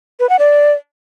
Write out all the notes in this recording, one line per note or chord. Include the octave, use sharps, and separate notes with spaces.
B4
F#5
D5